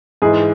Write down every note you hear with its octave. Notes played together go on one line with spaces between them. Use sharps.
G#2 E3 G#4